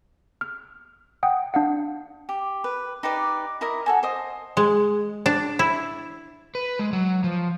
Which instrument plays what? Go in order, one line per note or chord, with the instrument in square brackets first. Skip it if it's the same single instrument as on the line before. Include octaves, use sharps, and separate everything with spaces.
[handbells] F6
F#5 G5 D#6
D4 F5 F#5
[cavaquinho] G4
B4
D#4 G4 B4 D5
E4 A#4 D#5 A#5
F#4 A4 G#5
C5 D#5 D#6
[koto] G#3
D4
E4
[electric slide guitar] B4
G#3
F#3
F3